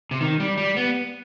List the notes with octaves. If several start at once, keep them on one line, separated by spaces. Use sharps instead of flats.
C3
D#3
G3
G3
B3